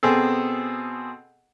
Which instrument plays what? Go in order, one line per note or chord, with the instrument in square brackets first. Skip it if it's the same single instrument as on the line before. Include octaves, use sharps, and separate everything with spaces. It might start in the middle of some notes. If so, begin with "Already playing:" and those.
[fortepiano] B2 C4 G#4 A4